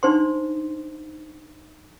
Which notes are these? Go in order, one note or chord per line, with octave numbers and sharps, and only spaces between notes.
D4 D#4 C5 C6